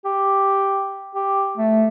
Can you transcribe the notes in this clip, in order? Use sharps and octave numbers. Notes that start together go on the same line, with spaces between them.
G4
G4
A3